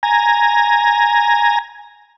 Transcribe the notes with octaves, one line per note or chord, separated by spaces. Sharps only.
G#5 A#5